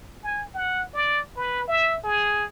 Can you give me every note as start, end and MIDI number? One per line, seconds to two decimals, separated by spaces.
0.23 0.44 80
0.54 0.84 78
0.93 1.20 74
1.36 1.67 71
1.68 1.98 76
2.04 2.44 68